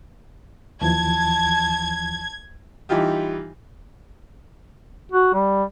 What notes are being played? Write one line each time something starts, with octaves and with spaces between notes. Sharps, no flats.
D#2 E3 F3 A5 G#6
E3 G3 D#4 F4 G4
F#4
G3